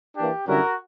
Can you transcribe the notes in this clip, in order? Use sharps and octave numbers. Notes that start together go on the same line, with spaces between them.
E3 A#3 D4 G4
F#2 D3 G3 C#4 E4 F#4 A#4